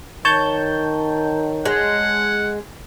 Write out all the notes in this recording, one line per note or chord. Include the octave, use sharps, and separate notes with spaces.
D#3 C#5 A5 G6
G#3 F#5